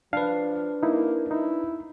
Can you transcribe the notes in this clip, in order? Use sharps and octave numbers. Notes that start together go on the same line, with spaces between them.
F3 D4 B4 F5
A#3 D#4 E4
D#4 E4